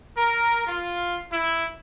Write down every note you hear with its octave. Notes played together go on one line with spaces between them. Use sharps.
A#4
F4
E4